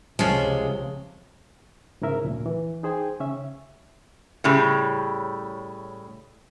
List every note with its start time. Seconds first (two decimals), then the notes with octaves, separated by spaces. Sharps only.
0.19 C#2 C3 F3 G#3 C#4 F4
2.02 G#2 C#3 E4 A#4 E5
2.25 D2 A#2 F3
2.46 E3
2.83 D#4 G#4 C5 G5 G#5
3.20 C#3 C#4 E5
4.44 A2 C#3 G3